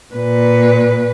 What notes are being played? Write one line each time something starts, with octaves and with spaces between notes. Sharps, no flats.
A#2 B4